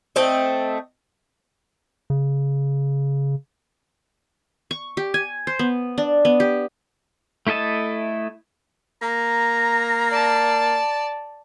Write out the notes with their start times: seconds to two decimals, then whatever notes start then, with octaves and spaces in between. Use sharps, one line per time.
0.16 A3 C4 D#5
2.10 C#3
4.71 C#6
4.97 G4
5.14 G#5
5.47 C5
5.59 B3
5.98 D4
6.25 B3
6.40 G4
7.47 A3 E4 A4 D#5 A5
9.02 A#3 A#5
10.09 D5 A5